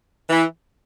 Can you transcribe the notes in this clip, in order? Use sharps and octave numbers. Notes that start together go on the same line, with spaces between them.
E3